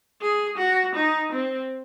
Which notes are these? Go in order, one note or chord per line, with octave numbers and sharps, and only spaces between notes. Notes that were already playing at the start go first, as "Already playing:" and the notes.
G#4
F#4
D#4
C4